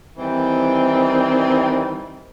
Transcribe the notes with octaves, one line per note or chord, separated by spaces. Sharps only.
D#3 E3 G3 C4